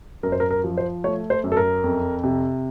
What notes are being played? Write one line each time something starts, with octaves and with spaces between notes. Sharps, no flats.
F#2 A#4
C5
A#4
A#4
F3
C5
A3 C#5
C5
F#2
A4
A#4
F2
C3